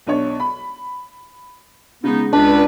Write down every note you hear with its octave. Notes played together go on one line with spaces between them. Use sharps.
B1 D4 C#5
B5
C#3 G#3 B3 D#4
C#2 D4 B4